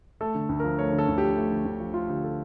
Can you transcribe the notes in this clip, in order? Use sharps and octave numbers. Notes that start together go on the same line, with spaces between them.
A3 A4
D3
D2
F3 A#4
A3 C#5
D3
A4
D2
F3 G4
A3
D3
D2
F3
A3 F4
D3 G4
A4